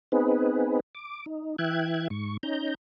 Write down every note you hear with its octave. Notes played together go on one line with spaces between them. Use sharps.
B3 C4 D#4 G#4 B4
D6
D#4
E3 E5 G5 F#6 G#6
G#2 C#6
C#4 D#4 A#5 G6